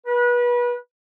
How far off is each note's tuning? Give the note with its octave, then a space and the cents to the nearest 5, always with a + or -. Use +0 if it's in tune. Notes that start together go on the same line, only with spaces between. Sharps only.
B4 -30